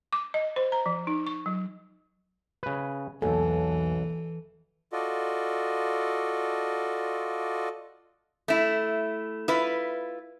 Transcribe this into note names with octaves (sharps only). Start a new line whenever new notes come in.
D6
D#5
C5
A#5
F3
D#4
C#6
F#3
C#3 B4
B1 E2 E3 A#3 A4 G#5
F4 F#4 A4 D5 D#5
A3 E4
E4 F4 B4